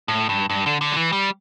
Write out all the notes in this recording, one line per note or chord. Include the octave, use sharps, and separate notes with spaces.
A2
G2
G2
D3
D3
F#3
E3
G3